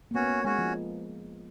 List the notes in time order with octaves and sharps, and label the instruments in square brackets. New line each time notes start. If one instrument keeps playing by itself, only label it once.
[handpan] A#3
[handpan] B3 [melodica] C#4 F#4 C#5
[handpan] A#3
[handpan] G#3 [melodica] C#4 F#4 C#5
[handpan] F3